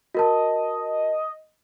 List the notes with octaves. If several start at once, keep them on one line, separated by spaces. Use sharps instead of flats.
F#4 A#4 D#5 A5